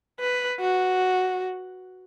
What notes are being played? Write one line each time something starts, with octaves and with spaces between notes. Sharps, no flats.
B4
F#4